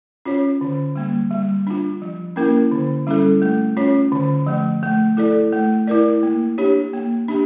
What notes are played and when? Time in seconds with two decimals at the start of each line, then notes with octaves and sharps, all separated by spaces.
0.25 C#4 F4 C#5
0.61 D3
0.96 G3 A#3
1.31 G3
1.67 D4 F4
2.02 F3
2.36 A#3 C#4 E4 A#4
2.71 D3
3.07 G3 C#4 E4 A4
3.42 A3
3.77 C#4 F4 C#5
4.12 D3
4.47 F3 A3
4.83 A3
5.17 E4 A4 D5
5.53 A3
5.87 E4 A#4 D5
6.23 A#3
6.58 D4 G4 C#5
6.93 A#3
7.28 D4 G4